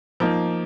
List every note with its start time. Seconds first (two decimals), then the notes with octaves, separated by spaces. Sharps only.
0.20 F3 A#3 D#4